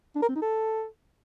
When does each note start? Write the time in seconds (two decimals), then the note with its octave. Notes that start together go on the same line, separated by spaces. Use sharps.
0.16 D4
0.22 A#4
0.29 C4
0.35 D#4
0.42 A4